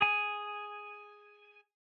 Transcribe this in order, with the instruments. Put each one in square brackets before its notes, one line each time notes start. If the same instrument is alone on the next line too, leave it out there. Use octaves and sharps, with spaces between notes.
[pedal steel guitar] G#4 G#5